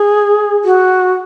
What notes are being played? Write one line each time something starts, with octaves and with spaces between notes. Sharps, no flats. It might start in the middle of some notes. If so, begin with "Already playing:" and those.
Already playing: G#4
F#4